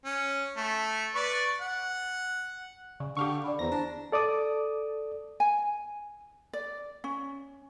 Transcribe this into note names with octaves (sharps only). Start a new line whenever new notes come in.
C#4
A3
B4 D5 C#6
F#5
C#3 D5
D3 G4 F5 C#6
D3 D5 B5
E2 C5 A#5 A#6
D4
A4 D5 D6 D#6
G#5
D5
C#4